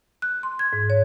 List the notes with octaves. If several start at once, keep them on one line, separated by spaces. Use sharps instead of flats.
F#6
C6
G#6
G#2
C#5